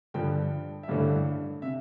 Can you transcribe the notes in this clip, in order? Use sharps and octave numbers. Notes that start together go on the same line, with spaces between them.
G2 D3 F3 G5
E5
A1 G2 D3 A3 F5
C3 E5